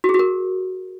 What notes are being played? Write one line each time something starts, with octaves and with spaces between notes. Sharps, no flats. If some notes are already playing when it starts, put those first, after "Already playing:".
F#4
G#4
F#4
A#4